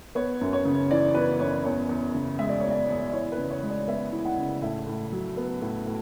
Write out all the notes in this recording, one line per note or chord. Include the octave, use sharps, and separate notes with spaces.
B3 C#5
F#2
C#5
C#3
E3 D5
B3 B4
F#2 C#5
D5
E2 C#5
E2
C#3
G#3 E5
D5
E2 C#5
D5
E2
D5
E4 C#5
B4
C#3
C#5
G#3
D5
B3 E5
E4
F#5
C#3
A2 E5
A2
F#3
B3
A2
A2